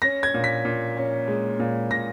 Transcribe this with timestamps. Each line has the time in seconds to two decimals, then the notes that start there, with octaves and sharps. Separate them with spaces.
0.02 C#4 A#6
0.23 G#6
0.34 A#2
0.44 B6
0.65 A#2
0.97 C#4
1.28 G#3
1.59 A#2
1.91 A#2 A#6